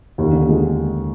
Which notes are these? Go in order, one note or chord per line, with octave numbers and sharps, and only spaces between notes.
D#2
D3
G#3